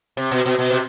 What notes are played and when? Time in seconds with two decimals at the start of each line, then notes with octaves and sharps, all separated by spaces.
0.17 C3
0.31 B2
0.46 B2
0.59 B2
0.70 C3